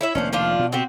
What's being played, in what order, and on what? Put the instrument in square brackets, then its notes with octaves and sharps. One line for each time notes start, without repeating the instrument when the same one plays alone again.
[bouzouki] E4 C#5 E5
[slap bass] F1 D#3 A#3 [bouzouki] C#4 D4 C5
[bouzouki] F3 D4 F4
[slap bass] B2
[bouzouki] C4 F#4 G4